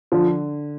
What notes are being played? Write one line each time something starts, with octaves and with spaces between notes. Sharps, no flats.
D3 F3